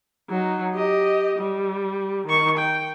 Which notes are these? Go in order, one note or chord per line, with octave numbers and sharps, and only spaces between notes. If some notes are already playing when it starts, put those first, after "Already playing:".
F#3 D#4
G4 D#5
G3
D#3 C#6
G5